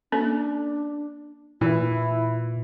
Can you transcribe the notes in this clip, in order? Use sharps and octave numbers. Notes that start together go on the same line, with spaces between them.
A#3 C#4 D4 A4
A#2 E3 E4